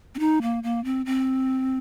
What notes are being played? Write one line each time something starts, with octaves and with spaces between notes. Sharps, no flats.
C4
D#4
A#3
A#3
C4
C4